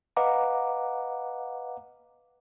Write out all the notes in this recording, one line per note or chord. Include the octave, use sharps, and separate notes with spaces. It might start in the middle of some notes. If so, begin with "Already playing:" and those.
B4 D#5 F5 F#5 A#5 D6